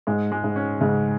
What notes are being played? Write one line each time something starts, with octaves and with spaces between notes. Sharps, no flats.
G#2 G#3
G#3
G#2
C#4
G#2 C#3